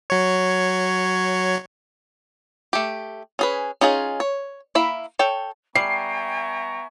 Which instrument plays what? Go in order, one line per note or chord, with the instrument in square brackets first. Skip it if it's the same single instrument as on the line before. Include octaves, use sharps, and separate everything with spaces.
[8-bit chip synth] F#3 C#5
[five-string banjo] A3 G4
C#4 G#4 B4
C#4 D#4 F4 G#4
C#5
A#3 E4 E5 B5
A4 C#5 G5
[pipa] G3 [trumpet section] B3 A#5 C#6 [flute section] E5 G5 G#5 [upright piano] C7